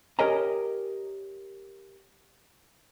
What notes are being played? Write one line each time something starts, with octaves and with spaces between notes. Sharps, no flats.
G4 A#4 C#5 D#5 G#5 A#5